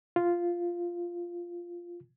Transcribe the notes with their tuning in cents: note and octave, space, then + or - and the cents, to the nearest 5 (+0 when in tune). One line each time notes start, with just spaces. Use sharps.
F4 -5